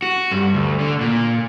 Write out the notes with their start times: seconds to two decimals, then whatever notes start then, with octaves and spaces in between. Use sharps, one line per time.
0.02 F#4
0.31 G2
0.54 D2
0.80 D3
1.01 A#2